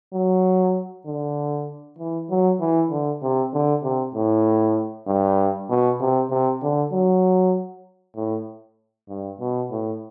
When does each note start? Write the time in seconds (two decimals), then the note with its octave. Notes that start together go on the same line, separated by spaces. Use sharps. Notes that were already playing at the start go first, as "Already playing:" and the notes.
0.14 F#3
1.06 D3
1.99 E3
2.30 F#3
2.60 E3
2.91 D3
3.23 C3
3.53 D3
3.83 C3
4.15 A2
5.08 G2
5.70 B2
6.00 C3
6.30 C3
6.62 D3
6.92 F#3
8.16 A2
9.09 G2
9.40 B2
9.71 A2